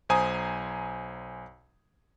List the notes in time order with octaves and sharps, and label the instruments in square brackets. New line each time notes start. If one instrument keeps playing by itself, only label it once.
[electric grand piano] B1 C5 G#5 A#5 D#6